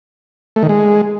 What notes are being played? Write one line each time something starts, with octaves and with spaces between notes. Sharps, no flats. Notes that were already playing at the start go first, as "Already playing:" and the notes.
A3
D#3
G#3